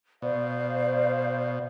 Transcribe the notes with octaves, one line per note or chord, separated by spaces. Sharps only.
B2 C5 D5 F5